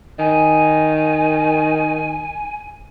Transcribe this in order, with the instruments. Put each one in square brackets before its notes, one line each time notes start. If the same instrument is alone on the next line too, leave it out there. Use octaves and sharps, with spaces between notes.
[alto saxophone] D#3 [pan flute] G#5